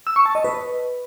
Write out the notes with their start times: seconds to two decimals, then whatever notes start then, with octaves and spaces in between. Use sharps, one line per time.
0.07 E6
0.16 C#6
0.26 A5
0.35 D#5
0.44 B4